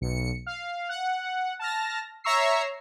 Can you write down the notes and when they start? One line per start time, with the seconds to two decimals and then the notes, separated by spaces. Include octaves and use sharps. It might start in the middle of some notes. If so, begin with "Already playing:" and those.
0.01 B1 C#7
0.46 F5
0.89 F#5
1.59 A5 F6 A#6
2.24 C#5 E5 A#5 C#6 E6 C7